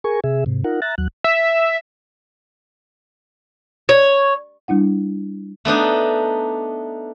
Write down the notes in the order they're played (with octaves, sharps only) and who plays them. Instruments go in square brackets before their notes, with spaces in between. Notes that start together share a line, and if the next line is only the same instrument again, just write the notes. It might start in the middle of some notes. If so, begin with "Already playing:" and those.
[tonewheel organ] G#4 A#4 G#5 C#6
C3 G#4 E5
G#2 C3
D#4 F4 A#4 F#5
E5 A#5 F#6 A6
D#2 F#3 F#6
[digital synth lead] E5
[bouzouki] C#5
[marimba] G3 D4 E4 F#5
[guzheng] A3 B3 D4 D#4